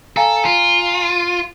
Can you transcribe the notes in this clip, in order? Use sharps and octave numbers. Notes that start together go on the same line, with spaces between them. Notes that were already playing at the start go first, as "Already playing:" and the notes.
A4 F5 G#5 A#5
F4